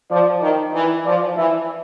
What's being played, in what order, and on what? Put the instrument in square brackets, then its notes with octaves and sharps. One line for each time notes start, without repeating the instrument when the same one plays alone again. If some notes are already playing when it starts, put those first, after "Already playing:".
[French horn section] F3 [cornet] D5
[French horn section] D#3
E3
[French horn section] F3 [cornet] D5
[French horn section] E3 [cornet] E5